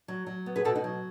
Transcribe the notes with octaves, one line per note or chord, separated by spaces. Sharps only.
F#3
F#3
B3
G#4 B4
B2 F#4 A4
D#4 F#4
F#3